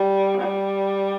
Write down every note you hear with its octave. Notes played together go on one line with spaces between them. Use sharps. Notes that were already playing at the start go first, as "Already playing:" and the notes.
Already playing: G3
G3